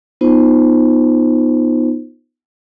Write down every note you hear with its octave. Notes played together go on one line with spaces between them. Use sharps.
B3 D#4 F4 C5